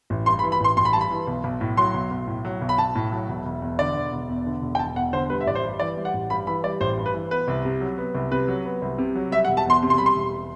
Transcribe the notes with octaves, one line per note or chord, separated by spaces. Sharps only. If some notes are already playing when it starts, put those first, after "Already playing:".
A1
G2 C6
B5
E3
B5
A1 C6
A1 C6
B5
G2 A5
B5
E3
B1
B1
A2
F#3 C6
B1
B1
A2
F#3
B1
B5
B1 A5
A2
F#3
E1
E1
E2
D3 D5
E1
E1
E2
D3
E1
G5
E1 A5
E2 F#5
D3 C5
G3 B4
E5
A1 D5
C5
G2
E3 D5
G3
F#5
A1
G2 B5
E3 B5
G3 D5
A1 C5
G2
B4
E3
B3 B4
C2
C3
F#3
B3
C2
C3 B4
F#3
B3
C2
C3
F#3
G3 E5
F#5
E1
A5
E2 C6
C3
C6
G3 B5
C6
E1